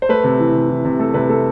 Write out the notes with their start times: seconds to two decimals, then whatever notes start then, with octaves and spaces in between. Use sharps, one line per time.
0.02 C5
0.09 A3 B4
0.24 C3
0.40 E3
0.54 C3
0.70 E3
0.85 C3
0.99 A3 A4
1.14 C3 B4
1.29 A3 A4